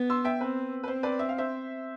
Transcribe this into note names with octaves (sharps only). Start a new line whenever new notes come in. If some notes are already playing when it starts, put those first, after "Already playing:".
Already playing: B3
C6 E6
E5 G5
C4 B4
B4
C4 C5
B4 D5
E5
F5
C5 E5